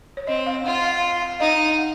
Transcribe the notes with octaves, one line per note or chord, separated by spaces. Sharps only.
C#5
C4 D#5
F5
F4 F#5
F5
F5
F5
D#4 D#5
F5
F#5